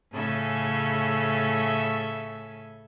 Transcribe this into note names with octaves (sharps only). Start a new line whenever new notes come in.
A2 C#3 A4 E5 G#5